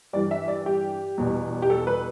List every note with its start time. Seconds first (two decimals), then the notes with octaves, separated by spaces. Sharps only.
0.13 G2 E3 G3 D5
0.31 E5
0.48 D5
0.66 G4
1.18 E2 B2 G3
1.62 G4
1.70 A4
1.87 B4